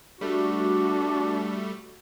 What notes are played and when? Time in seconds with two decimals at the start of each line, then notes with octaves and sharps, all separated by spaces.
0.21 G3 A3 D4 F#4